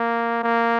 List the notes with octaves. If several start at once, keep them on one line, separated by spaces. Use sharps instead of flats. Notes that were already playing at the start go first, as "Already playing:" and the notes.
Already playing: A#3
A#3